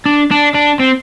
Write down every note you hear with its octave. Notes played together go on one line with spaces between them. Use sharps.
D4
D4
D4
C4